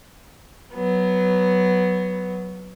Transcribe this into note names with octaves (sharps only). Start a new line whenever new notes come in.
F#3 B3